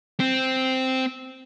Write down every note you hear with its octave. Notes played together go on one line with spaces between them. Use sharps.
C4